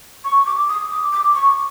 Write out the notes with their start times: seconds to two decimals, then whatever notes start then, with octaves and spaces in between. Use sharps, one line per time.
0.25 C#6
0.46 D6
0.69 D#6
0.91 D6
1.12 D6
1.35 C#6